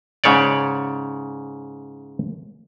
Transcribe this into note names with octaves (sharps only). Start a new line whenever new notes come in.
G#2 C#3 C#5 D5